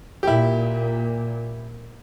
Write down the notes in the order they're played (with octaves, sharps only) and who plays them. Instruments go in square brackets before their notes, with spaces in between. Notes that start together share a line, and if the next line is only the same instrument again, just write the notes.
[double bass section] A#2 [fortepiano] E4 G4